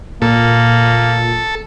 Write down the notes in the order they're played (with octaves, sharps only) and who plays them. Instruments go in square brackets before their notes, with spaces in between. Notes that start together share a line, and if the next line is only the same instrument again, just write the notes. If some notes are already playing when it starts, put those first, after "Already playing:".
[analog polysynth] A#2 [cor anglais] A#3 [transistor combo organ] A4